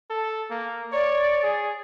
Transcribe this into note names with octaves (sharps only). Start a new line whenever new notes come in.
A4
A#3
C#5 D5
G#4